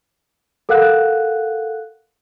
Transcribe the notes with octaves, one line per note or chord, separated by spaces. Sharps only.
A4 A#4 F5 F#5 F#6